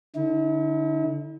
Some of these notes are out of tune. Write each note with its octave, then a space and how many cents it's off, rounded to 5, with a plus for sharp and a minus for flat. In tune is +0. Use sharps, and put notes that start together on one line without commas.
D3 +0 E4 -45